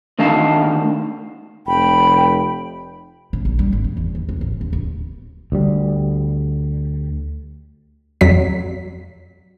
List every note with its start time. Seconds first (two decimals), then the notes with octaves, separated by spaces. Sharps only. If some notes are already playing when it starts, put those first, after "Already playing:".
0.19 D#3 A3 D4 D#5 F5 A5
1.67 F1 G5 B5
3.33 A2
3.45 A#1
3.59 G3
3.72 G#1
3.84 A2
3.97 E2
4.15 D#2
4.29 F2
4.41 A1
4.61 D#2
4.73 D1
5.52 D2 G3
8.21 F2 F#3 B6